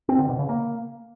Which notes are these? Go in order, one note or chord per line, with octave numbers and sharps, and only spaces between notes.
C4
D3
B2
C#3
A#3